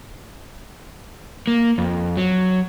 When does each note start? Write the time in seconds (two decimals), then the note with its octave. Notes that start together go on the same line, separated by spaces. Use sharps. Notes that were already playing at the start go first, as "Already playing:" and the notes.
1.47 A#3
1.78 F2
2.17 F#3